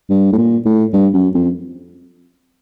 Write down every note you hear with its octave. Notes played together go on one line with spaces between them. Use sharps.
G2
A2
A#2
A2
G2
F#2
F2